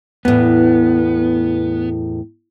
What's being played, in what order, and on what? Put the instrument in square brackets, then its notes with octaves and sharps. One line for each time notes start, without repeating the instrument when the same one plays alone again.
[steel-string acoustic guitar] E2 A2 [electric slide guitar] B3